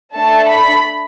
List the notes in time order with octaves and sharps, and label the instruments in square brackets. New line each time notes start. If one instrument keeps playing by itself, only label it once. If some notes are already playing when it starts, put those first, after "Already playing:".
[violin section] A3 D4 A4 A5
B5